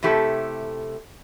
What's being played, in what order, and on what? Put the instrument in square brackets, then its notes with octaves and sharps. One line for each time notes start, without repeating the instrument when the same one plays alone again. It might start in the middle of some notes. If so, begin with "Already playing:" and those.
[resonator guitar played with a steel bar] C3 A3 E4 G4 A4